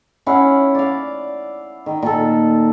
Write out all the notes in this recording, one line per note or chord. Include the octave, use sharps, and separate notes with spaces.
C#4 E4 F5 F#5
D5 F5
D#3
A#2 A4